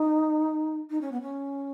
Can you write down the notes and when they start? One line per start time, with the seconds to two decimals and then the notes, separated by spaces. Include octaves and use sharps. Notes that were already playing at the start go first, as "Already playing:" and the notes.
Already playing: D#4
0.90 D#4
1.01 C#4
1.12 B3
1.22 C#4